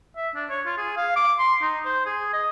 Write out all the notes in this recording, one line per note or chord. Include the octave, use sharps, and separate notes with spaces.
E5
D4
C#5
F4
G#4
F5
D6
C6
D#4
C5
G#4
D#5